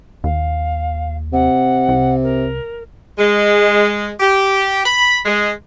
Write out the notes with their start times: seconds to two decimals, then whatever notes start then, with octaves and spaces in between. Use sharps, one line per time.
0.24 D#2 F5
1.33 C3 F#5
1.88 C2
2.23 A#4
3.18 G#3
4.20 G4
4.85 B5
5.25 G#3